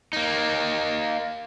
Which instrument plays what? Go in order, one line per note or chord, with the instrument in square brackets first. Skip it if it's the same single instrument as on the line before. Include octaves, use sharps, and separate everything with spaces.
[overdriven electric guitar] A#3 D#4